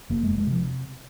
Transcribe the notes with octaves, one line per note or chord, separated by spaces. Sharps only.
F1 A#3
G#3
F1
G#3
C3 F3